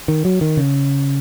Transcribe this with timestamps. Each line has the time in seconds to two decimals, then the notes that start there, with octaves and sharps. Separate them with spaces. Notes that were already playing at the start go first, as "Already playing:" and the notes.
0.08 D#3
0.25 F#3
0.41 D#3
0.57 C#3